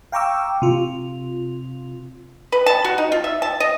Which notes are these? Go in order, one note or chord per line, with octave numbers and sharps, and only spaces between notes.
F5 G5 A#5 C#6 D6 E6
C3 F4
B4
A5
F#4
D#4
F4
E5
A5
D#5